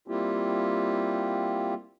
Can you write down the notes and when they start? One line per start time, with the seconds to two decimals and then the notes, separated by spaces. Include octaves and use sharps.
0.08 G3 A#3 C4 E4 F4 G4